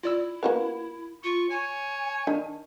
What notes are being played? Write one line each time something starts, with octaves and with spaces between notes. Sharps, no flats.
E4 F4 D5 E6
A#3 B3 C#4 F#4 A#4 B4
F4 C#6
C#5 G#5
D#3 D4 A#4